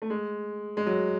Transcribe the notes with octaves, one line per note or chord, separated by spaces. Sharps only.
A3
G#3
G#3
F#3